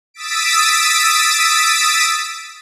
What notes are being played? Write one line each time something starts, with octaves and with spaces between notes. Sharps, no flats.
D#6 E6 A6 B6 D7